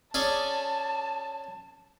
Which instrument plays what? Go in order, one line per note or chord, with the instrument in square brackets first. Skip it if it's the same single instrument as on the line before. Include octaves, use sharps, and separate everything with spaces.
[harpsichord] C#4 G#4 D5 [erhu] A5